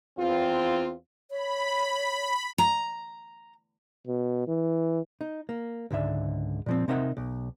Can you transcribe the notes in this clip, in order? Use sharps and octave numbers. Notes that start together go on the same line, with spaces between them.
E2 C4 F4
C#5 B5
A#5
B2
E3
D#4
A#3
C#2 G#2 D3 E5
A#2 F3 C4
C3 C4 D#4 A#4 E5 F#5
B1